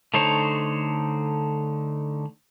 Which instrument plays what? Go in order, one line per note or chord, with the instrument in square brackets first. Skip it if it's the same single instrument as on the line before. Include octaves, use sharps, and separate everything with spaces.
[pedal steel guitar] D3 A3 D#4 C5 C#5